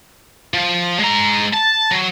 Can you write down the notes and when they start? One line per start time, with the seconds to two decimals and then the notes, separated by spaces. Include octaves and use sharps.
0.54 F3
1.00 G#3 A#5
1.53 A5
1.91 F#3